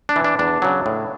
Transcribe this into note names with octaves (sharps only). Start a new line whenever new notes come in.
D4
E3
D4
E2 D4
C#3 F#3
A2